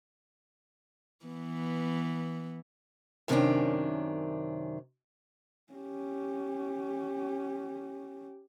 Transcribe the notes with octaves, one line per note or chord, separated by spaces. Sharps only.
E3 B3
F#2 C3 D#3 G3 C#4 D4
C#4 G4